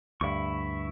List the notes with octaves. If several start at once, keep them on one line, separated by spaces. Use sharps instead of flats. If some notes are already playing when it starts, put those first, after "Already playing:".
D2 G2 E4 C#6